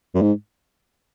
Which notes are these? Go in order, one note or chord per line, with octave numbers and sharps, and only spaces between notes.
F#2
G#2